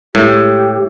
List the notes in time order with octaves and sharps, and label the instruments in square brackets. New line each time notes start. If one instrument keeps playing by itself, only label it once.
[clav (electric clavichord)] A2 [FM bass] G#3 [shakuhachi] G4